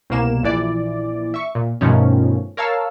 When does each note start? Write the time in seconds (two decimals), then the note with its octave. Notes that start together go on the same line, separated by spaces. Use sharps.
0.10 C2 B2 A#3 E7
0.43 A#1 E3 D5
1.34 E5 C#6
1.55 A#2
1.81 G2 B2 D#3 F3 A3 C#4
2.57 A#4 C#5 F5 A5 E6 F6